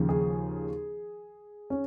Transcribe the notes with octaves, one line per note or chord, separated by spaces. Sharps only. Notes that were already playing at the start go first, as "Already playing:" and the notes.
Already playing: D#2 C#3 F3
G#4
C#4